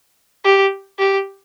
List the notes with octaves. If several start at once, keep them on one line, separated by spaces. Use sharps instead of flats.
G4
G4